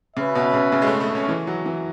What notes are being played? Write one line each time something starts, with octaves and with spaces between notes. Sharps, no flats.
C#3 C#4 F#4 B4 E5
B2
C#3
C#3
G#3
A3
A3
C#4
E3
F#3
E3